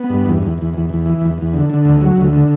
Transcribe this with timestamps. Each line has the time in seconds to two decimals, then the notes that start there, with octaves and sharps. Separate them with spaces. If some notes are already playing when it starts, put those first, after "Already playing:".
Already playing: B3
0.09 G2
0.26 E2
0.42 E2
0.58 E2
0.74 E2
0.89 E2
1.06 E3
1.21 E2
1.38 E2
1.53 D3
1.70 D3
1.85 D2
2.01 F#3
2.17 D2
2.33 D3